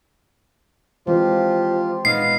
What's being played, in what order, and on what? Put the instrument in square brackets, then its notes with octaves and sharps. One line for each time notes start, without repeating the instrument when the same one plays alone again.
[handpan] E3 G#3 C4 [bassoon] F3 [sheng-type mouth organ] F4 G4
[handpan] A#2 G#3 D#4 [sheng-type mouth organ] B3 D#5 F5 [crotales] C7